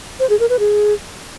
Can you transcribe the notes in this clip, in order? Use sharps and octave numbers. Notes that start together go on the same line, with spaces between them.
C5
G#4
A#4
B4
G#4